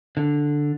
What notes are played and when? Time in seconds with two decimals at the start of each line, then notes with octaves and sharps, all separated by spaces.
0.17 D3